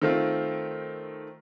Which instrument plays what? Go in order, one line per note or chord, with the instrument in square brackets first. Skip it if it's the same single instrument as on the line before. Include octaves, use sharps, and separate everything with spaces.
[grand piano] D#3 A3 C4 F4